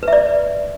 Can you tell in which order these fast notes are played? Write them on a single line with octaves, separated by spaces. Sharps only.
B4 E5 D5